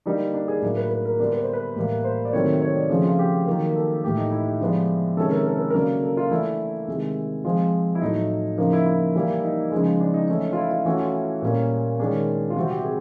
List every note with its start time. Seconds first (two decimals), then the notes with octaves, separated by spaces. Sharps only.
0.06 D3 G3 A#3 D4 D#4
0.34 D4
0.48 G#4
0.62 A2 F#3 A#3 D4 A#4
0.77 B4
0.91 B4
1.05 A#4
1.19 D3 G3 B3 D4 A#4
1.33 B4
1.43 C5
1.53 B4
1.76 A2 E3 G3 A#3
2.04 C5
2.25 D5
2.33 C3 D#3 F#3 A3 C4 C#5
2.62 C#5
2.76 D5
2.90 C#3 F3 A3 C4 G#4
3.04 F4
3.19 G4
3.46 D#3 F#3 A#3
3.75 A4
4.04 A2 E3 A3 G4
4.17 D#4
4.31 E4
4.47 G4
4.60 D3 F3 G#3 B3 D4
5.17 C3 D#3 G#3 C#4 A4
5.32 A#4
5.46 A#4
5.57 B4
5.70 C#3 F#3 A#3 D4 A#4
6.02 A4
6.17 F4
6.31 E3 A3 D4 E4
6.88 C3 D#3 G#3
7.44 F3 G#3 C4 F4
7.95 E4
8.02 A2 F#3 A3 D#4
8.58 C#3 F3 A#3 D#4
8.73 E4
8.86 E4
9.15 E3 G3 A#3
9.44 D#4
9.72 C#3 F3 G#3
10.00 D4
10.14 D#4
10.28 E3 A3 C#4 D#4
10.53 F4
10.57 E4
10.71 F4
10.85 E3 A3 C#4 F#4
11.00 F4
11.14 E4
11.42 A#2 G3 A#3 C#4
11.99 D#3 G#3 C#4 D4
12.50 F4
12.56 C3 E3 G3 C4 F#4
12.70 G4
12.84 G#4